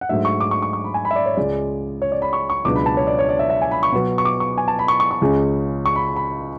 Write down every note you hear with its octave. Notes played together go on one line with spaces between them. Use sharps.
F#5
G#2 F#3 A3 D4 E5
C#6
D6
C#6
C#6
C#6
B5
G#5
B5
E5
D5
C#5
C#2 C#3 G#3 D5
C#5
D5
B5
C#6
C#6
C#2 B2 F#3 B3 D4 D6
B5
A5
C#5
D5
C#5
D5
E5
E5
G#5
B5
C#6
B2 F#3 B3
C#6
D6
C#6
G#5
A5
B5
C#6
C#6
C#6
C#2 C#3 G#3 C#4
C#6
B5
B5